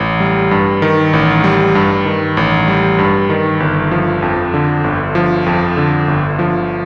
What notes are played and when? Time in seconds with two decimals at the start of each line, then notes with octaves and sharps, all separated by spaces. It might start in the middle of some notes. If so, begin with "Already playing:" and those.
Already playing: A1
0.20 G3
0.51 G2
0.82 D#3
1.13 A1
1.44 G3
1.75 G2
2.06 D#3
2.37 A1
2.68 G3
2.99 G2
3.30 D#3
3.60 G1
3.91 F3
4.22 F2
4.54 D3
4.84 G1
5.15 F3
5.46 F2
5.77 D3
6.08 G1
6.39 F3